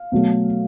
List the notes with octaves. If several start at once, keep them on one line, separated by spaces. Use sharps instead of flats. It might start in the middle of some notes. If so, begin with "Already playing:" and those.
Already playing: F5
B2 F#3 A3